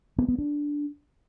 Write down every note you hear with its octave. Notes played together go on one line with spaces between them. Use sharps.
B3
B3
D4